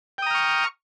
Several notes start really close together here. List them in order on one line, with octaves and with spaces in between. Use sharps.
G5 D#6 A#5 F6 C#6